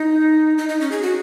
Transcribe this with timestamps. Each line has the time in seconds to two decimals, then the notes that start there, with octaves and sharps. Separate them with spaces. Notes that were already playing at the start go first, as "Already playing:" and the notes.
Already playing: D#4
0.58 D#4
0.69 D#4
0.81 C#4
0.92 G#4
1.02 F#4